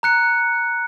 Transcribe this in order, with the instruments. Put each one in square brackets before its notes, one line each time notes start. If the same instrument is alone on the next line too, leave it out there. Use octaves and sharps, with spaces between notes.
[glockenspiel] A#5 F#6 C#7